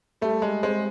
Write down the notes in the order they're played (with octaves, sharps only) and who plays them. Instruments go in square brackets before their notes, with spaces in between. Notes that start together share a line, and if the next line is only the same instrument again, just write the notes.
[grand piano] G3 [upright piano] A3
[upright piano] G#3
[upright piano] G#3 [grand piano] C4